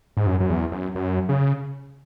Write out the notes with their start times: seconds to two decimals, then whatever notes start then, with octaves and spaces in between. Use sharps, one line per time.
0.17 G#2
0.27 F#2
0.40 F#2
0.50 E2
0.72 F#2
0.95 F#2
1.29 C#3